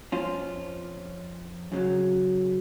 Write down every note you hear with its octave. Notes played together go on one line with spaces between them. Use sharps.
F2 F3 C#4 F4
F#2 C#3 F#3